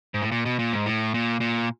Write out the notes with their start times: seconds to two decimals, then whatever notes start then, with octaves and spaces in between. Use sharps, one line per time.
0.14 G#2
0.22 A2
0.32 A#2
0.45 B2
0.59 A#2
0.73 G#2
0.86 A2
1.14 A#2
1.40 A#2